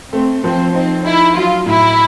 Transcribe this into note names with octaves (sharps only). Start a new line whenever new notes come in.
A3 C4
F3 C4
C4 D#4
D#4 E4
F#3 F4
A2 E4